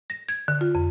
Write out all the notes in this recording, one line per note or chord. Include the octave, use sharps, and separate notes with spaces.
A#6
G#6
D3
F4
F2